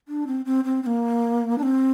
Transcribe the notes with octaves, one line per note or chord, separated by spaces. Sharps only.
D4
C4
C4
C4
C4
A#3
D4
C4